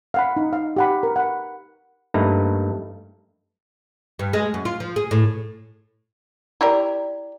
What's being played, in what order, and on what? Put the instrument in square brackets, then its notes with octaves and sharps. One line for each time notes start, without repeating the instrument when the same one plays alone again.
[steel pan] F5 F#5 B5
D#4
F5
G4 F#5 B5
A#4
F#5 B5
[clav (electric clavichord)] G2 A3 A#3 D#4 B4 A#5
[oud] G2
G#3
F#2
F4
F3
G#4
A2
[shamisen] E4 G4 A#4 [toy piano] D5 A#5